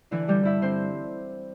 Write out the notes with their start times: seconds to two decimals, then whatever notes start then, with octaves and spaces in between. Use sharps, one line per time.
0.11 D3 E3 E4
0.28 D3 G3 G4
0.43 G2 E4 E5
0.61 D3 C4 C5